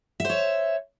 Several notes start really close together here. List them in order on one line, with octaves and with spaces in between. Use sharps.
E5 C5 C#5